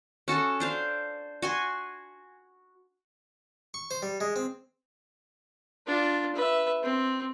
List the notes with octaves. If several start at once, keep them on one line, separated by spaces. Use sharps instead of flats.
C#4 F#4 A4 A5
D4 C5 F5
F#4 G#5 C6
C#6
C5
G3
G#3
C4
D4 F4
B4 E5
C4